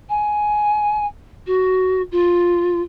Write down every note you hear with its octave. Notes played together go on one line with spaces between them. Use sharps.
G#5
F#4
F4